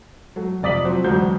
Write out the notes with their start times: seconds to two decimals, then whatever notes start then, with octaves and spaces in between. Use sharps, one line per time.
0.36 F#3 A3
0.62 F1 C3 D5 D#6 B6 F#7
0.84 F3 F#3 C4
1.04 E1 D2 F#3 C5 G6